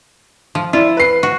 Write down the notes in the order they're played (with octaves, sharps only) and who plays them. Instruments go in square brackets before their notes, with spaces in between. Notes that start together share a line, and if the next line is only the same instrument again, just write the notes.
[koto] F3
[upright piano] E4 D5 [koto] F4
[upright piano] B4 C7
[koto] F#4